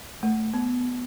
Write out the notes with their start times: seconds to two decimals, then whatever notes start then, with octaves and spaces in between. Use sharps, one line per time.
0.23 A3
0.54 B3